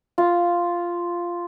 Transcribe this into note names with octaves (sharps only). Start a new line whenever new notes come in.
F4